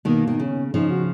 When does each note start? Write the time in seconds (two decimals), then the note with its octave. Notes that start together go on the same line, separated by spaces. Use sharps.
0.05 B2 D#3 A#3
0.27 D#3
0.39 C#3 C#4
0.74 C#3 F3 D#4
0.90 F#4